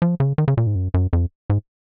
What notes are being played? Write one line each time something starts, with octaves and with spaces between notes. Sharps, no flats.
F3
C#3
D#3
C#3
A#2
G#2
F#2
F#2
F2
G#2